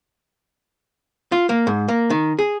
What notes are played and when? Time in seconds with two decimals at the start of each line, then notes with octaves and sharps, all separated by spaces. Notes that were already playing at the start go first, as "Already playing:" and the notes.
1.32 F4
1.49 A#3
1.67 G#2
1.88 A#3
2.10 D#3
2.39 G#4